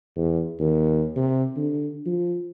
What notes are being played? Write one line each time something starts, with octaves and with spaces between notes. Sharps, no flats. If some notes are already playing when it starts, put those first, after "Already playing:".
E2
D#2
C3
D3
F3